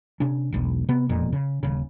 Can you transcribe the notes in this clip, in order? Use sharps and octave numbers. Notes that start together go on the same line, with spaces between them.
C3 C#4 D4
E1 B1
C3 B3
E1 F2 A#2
C#3
D#1 C#3